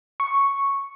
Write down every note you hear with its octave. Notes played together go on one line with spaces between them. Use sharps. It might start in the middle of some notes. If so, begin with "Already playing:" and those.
C#6